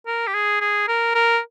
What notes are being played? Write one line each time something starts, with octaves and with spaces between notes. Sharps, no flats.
A#4
G4
G#4
G#4
A#4
A#4